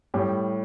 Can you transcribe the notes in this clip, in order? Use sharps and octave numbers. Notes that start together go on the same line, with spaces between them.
A2 G3 G4